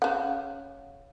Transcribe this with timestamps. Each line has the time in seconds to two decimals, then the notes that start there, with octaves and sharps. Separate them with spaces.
0.02 C#3 F#5